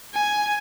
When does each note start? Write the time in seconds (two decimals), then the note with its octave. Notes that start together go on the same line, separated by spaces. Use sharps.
0.14 G#5